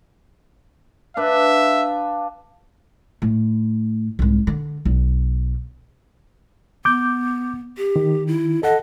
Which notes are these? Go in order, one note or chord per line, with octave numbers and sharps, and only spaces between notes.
D4 B4 E5 F5
A2
C2 G#2
D3
B1
B3 D6 G6
G4
D#3
E4
A4 D#5 F#5